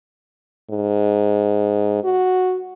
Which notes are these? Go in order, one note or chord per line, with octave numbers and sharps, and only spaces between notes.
G#2
F#4